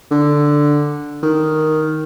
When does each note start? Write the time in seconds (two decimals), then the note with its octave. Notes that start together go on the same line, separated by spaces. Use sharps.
0.11 D3
1.23 D#3